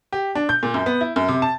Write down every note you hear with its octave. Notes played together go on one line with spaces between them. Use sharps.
G4
D4
G6
A#2
F#2
B3
E4
F#2
C3
A5